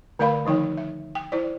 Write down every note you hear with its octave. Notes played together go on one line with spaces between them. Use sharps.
D3 A3 A#4 D5 F5 B5
D#3 F3 D#4 C#5 G5
E5
G5
E4 C5 D5